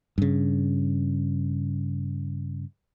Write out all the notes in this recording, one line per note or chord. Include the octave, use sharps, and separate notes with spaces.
G2 C#3